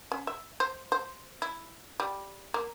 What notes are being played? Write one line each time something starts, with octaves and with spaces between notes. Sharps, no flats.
C#4
E5
C5
C5
E4
G3
A#3